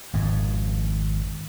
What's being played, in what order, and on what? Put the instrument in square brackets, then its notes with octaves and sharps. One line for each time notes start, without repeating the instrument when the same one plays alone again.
[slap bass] G#1 F2 G#2